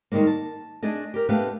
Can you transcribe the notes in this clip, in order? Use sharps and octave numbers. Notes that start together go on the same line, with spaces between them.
D#3 E3 G3 G#3 A#3
A5
A3 D4 G#4 A4 D#5
G4 A#4
A3 B3 D4 G4 B4 F5